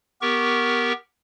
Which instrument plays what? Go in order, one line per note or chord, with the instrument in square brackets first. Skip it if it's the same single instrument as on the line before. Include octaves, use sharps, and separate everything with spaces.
[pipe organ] B3 G4 A#4 C#6